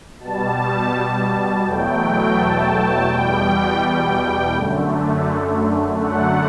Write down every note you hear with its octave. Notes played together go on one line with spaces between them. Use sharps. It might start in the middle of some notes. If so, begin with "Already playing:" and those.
B2 G3 A5
E2 B2 F#3 A3 G5
A5
E2 B2 G3 G5
G5
F#2 D3 A3
F#2 D3 F#3 A3 F#5